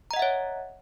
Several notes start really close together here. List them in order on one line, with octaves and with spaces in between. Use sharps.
A#5 D#5 F#5 E5 C#5